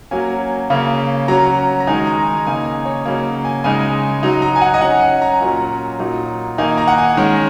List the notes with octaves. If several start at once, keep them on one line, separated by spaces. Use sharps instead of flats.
F#3 A#3 C#4 G#5
C#3 A#3 C#4
F#3 C#4 A#5
A#5
D#3 G#3 D#4 G#5
A#5
G#5
C#3 A#3 D#4 G#5
G#5
C#5
C#3 F#3 A#3 C#5
G#5
C#3 G#3 D#4 G#5
F#3 D#4
A#5
G#5
F#5
D#5
F#3 C#4 F#5
G#5
A#5
A#2 F#3 C#4
A#2 F#3 D#4
D#3 A#3 D#4 G#5
A#5
F#5
G#5
D#3 G#3 C#4